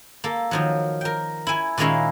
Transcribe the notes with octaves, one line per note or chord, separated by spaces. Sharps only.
A#3 A4
D#3 F3 F#3
A#4 G5
E4 G#5
A#2 D#3 G#3 A#3 C#4 E4